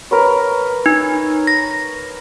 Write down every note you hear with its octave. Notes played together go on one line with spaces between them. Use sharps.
A#4 B4 C#5
D#4
A#6